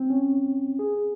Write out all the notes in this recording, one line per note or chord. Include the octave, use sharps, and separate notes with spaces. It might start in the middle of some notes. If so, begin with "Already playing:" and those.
Already playing: C4
C#4
G#4